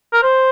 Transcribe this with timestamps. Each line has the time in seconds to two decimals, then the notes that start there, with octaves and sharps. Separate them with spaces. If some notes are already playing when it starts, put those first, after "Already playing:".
0.13 A#4
0.23 C5